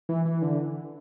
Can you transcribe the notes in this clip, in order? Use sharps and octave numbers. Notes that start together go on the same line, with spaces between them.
E3
E3
D3